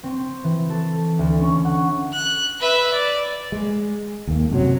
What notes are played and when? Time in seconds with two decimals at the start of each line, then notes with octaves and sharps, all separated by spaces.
0.03 C4
0.44 E3
0.70 A4
1.19 D2
1.40 C#4
1.65 F#5
2.13 F#6
2.60 B4 E5
2.92 D5
3.52 G#3
4.27 D#2 A#3
4.51 F#2 C3 F#3